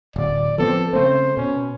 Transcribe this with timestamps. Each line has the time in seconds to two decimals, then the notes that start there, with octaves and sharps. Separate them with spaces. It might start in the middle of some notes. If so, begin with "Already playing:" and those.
0.16 D1 D5
0.58 F3 B3 C4 A4
0.93 C#3 A3 C4 C5
1.37 B2 C#4